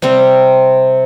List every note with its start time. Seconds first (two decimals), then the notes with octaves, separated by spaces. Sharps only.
0.02 C3 G3 C4